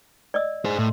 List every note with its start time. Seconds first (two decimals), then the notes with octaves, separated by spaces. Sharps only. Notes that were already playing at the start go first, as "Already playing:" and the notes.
0.34 D5 D#5 E6
0.65 G#4 C5
0.79 A2 C6